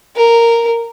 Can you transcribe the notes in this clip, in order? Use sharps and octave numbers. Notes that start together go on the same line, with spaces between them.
A#4